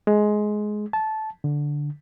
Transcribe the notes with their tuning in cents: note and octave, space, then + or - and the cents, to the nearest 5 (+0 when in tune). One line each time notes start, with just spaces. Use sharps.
G#3 +15
A5 -15
D3 -5